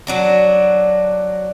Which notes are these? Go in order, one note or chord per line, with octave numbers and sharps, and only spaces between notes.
F#3 D4 F#4